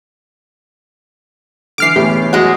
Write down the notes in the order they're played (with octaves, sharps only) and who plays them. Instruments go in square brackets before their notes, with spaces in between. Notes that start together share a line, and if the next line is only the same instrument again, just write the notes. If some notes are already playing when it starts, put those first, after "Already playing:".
[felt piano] D3 E3 [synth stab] D6 F6 C7
[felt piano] E2 E3 [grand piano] A2 [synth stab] G4
[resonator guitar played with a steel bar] F#3 G#3 [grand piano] F#4